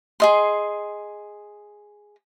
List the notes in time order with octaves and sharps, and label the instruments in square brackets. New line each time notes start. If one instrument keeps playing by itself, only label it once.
[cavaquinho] G#4 D#5 C6